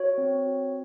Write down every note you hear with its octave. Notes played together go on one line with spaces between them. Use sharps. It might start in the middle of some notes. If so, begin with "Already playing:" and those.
Already playing: F#4 C#5
C4
F#4